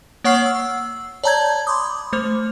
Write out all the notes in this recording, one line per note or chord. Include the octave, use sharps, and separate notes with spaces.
A#3 C#5 F#5 C#6 F6 C7
E6
C#5 D5 A5 A#5 G6 G#6
B5 C6 D6 D#6
A3 C5